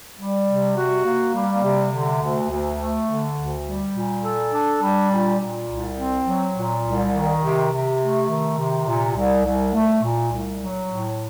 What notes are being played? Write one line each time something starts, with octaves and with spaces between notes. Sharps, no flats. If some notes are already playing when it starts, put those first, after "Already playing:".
G3
C3
F#4
A#3
G3
C3
D3
D2
D2
A3
D3
D2
G3
A#2
A4
D4
G3
A#2
A#2
C2
C4
F#3
A#2
C2
D#3
C3
C3
A3
D#3
C3
A#2
C2
C2
A3
A#2
C2
F#3
A2